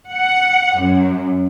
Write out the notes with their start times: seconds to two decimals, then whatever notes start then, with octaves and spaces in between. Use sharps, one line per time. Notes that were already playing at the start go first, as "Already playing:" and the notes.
0.12 F#5
0.79 F#2